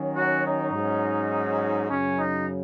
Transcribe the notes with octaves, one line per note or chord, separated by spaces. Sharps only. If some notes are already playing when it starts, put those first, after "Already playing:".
Already playing: D#3 F#3 C#4
F#4
D#4
G#2 F#3 C#4
F#2 C#3 F#3 C#4
D#4